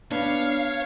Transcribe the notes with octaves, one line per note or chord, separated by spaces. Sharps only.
B3 D4 C#5 F5